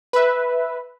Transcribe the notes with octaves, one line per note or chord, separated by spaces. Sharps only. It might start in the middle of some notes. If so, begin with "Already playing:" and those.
B4 E5